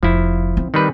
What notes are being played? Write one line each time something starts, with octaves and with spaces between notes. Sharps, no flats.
F1 F3 E4
C4
D#3 G3 B4